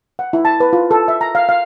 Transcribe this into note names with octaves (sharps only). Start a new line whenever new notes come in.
F#5
E4
A5
B4
F4
A4
E5
A#5
F5
F5